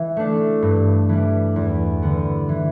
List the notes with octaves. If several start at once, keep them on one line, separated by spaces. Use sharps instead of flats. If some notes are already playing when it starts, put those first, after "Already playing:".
Already playing: E3
A3 D4
G2
E3 G3
E2
D3 G3 B3
E3